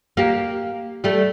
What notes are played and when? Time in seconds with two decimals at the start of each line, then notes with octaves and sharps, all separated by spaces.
0.17 A#3 G4
1.04 G3 A3